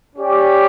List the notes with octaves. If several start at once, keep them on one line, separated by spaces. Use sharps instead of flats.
C#4 G4 D5